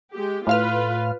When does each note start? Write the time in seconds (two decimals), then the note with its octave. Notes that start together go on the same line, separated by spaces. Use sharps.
0.13 G#3 G4
0.47 A2 F4 B4 F5 F6